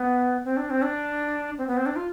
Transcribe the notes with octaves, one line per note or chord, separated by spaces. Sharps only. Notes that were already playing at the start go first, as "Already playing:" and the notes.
Already playing: B3
C4
D4
C4
D4
C4
B3
C4
D4
F4